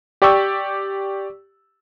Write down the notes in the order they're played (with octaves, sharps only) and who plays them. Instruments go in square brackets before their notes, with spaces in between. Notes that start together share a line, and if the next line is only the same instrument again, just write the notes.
[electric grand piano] G4 D5 G5 C#6 E6